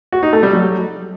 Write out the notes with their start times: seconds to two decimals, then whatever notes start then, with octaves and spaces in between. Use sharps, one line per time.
0.12 F#4
0.23 D#4
0.33 A3
0.43 G3
0.53 F#3